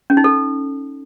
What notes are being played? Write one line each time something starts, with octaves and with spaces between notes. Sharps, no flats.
C#4
D#4
A4